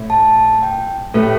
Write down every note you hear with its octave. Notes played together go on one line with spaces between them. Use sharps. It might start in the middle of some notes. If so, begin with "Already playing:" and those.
Already playing: A2 A3 E4
A5
G5
A2 A3 G4 A4 B4